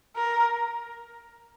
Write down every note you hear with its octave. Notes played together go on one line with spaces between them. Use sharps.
A#4